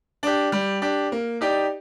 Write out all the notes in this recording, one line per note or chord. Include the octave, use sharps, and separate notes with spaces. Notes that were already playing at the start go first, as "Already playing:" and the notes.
D4 G4
G3
D4 G4
A#3
D#4 G4 D5